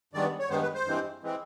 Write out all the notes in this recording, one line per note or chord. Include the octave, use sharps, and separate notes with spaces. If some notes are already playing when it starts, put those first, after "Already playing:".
G2 D#3 G#3 B3 D5
C#5
G2 D#3 G#3 B3 C5
B4
C5
G2 E3 G#3 C4
E3 G#3 C4